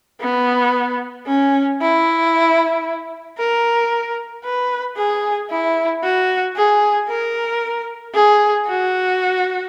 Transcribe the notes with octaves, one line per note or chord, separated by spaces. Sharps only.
B3
C#4
E4
A#4
B4
G#4
E4
F#4
G#4
A#4
G#4
F#4